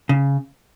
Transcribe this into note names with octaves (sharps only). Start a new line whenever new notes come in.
C#3